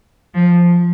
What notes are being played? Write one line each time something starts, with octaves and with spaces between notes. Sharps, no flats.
F3